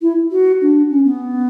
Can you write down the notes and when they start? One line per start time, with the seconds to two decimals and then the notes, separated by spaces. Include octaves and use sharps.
0.02 E4
0.31 F#4
0.61 D4
0.90 C#4
1.05 B3